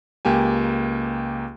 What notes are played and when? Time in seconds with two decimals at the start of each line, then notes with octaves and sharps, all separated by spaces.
0.25 C#2 A#3 G4 G#5